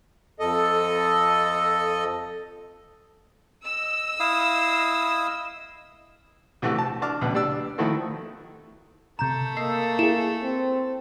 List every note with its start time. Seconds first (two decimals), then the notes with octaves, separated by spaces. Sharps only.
0.40 F2 A4 D#5
3.64 D#5 E6
4.20 E4 F5 D#6
6.62 C2 E3 A3 F#4 G4
6.78 A5
7.02 D4 F#4 A5 D6 F6
7.21 C#2 B2 B4
7.34 G3 D4 D5 E6
7.78 D#3 F3 A3 E4 F#4 A4
9.19 C3 A3 A4 A#5 G6 E7
9.57 A#3 D#5 E6 C7
9.99 E4 G#4 E7
10.43 C4